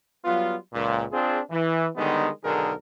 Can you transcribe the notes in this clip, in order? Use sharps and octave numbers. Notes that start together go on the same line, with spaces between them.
F#3 G3 B3 F4
C#2 A#2
C4 D4 F4 G#4
E3
D3 D#3 G3 G#3 B3 D#4
B1 D3 D#3 D#4 G#4 A#4